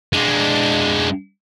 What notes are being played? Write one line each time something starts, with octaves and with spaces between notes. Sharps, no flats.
G#3 D4